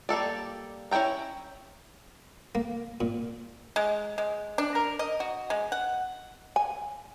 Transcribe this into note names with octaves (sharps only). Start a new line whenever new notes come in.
G3 A#3 A4 D5
C#4 E4 C#5 G5 A#5
A#3
A#2
G#3
G#3
D4
A#4
D#5
F#4
G#3
F#5
G#5